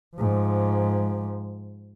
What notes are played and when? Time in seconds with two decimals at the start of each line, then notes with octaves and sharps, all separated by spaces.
0.16 G#2 F3